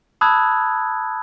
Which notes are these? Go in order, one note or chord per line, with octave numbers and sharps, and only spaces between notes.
A5 B5 D#6 E6 F#6 G#6